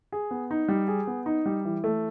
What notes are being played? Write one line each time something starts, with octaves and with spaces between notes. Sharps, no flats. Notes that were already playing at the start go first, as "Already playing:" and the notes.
G#4
B3
D#4
G3
G#4
B3
D#4
G3
E3
A3